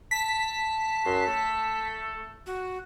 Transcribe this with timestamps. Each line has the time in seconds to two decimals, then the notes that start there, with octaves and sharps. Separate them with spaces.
0.11 A5 B6
1.05 F#2 F#4 C6
1.26 A3 A4
2.46 F#4